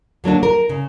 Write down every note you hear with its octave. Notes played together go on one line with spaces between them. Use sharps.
D3 F#3 A#3 D4
A#4
C#3